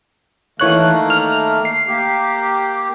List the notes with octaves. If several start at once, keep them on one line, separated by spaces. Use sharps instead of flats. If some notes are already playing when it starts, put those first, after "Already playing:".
D#3 E3 A3 A#3 C#5 F#6
F6
C7
A#3 G4